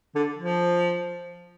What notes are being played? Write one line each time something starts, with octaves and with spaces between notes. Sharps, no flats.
D3
F3